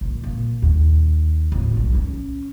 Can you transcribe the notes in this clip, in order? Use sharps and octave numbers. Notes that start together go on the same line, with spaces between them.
A#1
A#2
D#2
D1
B1 F3
C#4